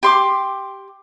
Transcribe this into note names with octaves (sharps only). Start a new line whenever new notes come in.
G4 C6 D6